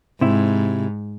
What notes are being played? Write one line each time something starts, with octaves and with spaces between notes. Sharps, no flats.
G#2 C3 E4